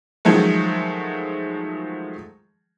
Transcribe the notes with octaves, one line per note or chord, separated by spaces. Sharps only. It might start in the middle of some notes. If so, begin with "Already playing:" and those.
D#3 F3 F#3 G#3 A3